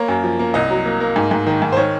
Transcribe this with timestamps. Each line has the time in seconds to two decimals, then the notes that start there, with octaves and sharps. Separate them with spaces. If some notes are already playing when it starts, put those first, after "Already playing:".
Already playing: A#3 C#5
0.08 F#2
0.24 F3
0.39 A#3
0.54 C2 D#5
0.70 F#3
0.85 A#3
1.00 A#3
1.16 G#2
1.31 G#2
1.46 D#3
1.62 G#2
1.72 C5
1.77 D#3 C#5